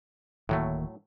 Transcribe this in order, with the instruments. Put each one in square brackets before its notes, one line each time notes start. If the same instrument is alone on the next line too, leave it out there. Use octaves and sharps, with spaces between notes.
[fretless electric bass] D1 D#3 A#3 [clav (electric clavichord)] A2 F#3 A3